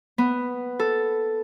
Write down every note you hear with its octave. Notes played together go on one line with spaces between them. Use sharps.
B3
A4